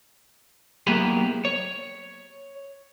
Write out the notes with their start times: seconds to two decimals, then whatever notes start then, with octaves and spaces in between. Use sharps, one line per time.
0.87 F#3 A#3 B3 E4 G4 G#4
1.45 C#5